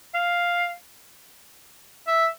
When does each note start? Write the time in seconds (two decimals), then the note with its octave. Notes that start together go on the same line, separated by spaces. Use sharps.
0.15 F5
2.08 E5